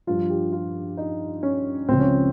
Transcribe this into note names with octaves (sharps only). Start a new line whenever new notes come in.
G2 F3 F4
G4
F4
D#4
C#4
C#2 C#3 F3 C4
C#4